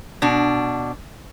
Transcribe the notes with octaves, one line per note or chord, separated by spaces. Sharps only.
B2 D4